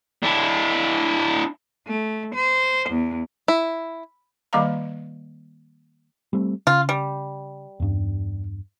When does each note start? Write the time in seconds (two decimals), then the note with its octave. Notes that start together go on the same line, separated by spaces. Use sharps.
0.23 D4 E4
1.87 A3
2.35 C5
2.90 E2
3.48 E4
4.53 D#3 G3 A#3 D#5 F5 A#5
6.33 G3 A3 C4
6.67 C#3 F4
6.89 G3
7.80 E2 G2